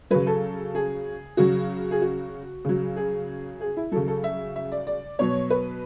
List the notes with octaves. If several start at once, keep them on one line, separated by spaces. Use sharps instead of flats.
C#3 F#3 B4
A4
G#4
C#3 F#3 F#4
G#4
F#4
C#3 F#3
G#4
G#4
E4
C#3 F#3 A4
A4
E5
E5
D5
D5
B2 F#3 C#5
B4